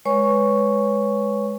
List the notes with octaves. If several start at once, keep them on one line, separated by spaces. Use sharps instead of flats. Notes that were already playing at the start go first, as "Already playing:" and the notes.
G#3 B4 C#5 G#5 C#6